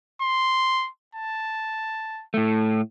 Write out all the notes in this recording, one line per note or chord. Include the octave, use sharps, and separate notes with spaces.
C6
A5
A2 A3